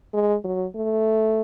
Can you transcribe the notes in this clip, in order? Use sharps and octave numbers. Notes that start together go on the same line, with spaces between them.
G#3
F#3
A3